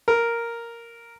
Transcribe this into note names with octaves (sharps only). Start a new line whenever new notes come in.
A#4